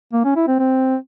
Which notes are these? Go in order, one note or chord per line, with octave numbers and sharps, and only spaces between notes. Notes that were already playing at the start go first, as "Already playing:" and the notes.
A#3
C#4
E4
C4
C4